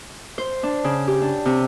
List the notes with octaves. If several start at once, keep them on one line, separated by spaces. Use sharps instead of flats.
C5
D4
C#3
G4
D4
C3